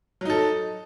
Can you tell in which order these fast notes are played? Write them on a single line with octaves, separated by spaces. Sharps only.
F#3 D#4 A4